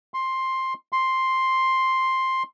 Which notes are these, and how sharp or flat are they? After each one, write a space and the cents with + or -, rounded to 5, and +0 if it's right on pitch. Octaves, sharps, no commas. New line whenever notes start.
C6 +10
C6 +5